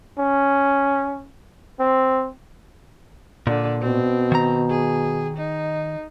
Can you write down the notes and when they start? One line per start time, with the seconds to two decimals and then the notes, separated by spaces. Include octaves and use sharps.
0.19 C#4
1.80 C4
3.47 A#2 D3
3.81 B2 C4
4.32 D#3 A#5
4.70 G#4
5.37 D#4